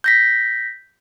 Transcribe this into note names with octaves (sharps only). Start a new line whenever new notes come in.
G6 A#6 B6